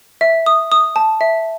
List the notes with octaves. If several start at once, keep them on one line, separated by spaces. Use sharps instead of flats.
E5
D#6
D#6
A5
E5